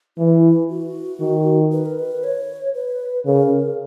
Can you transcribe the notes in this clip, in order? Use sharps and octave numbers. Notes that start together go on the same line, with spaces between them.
E3 E4
F#4
D#3
B4
A#4
B4
C#5
B4
C#3 A#4